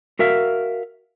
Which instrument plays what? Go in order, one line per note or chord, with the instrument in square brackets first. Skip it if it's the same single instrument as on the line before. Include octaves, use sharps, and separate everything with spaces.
[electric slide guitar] F#4 A#4 E5 F5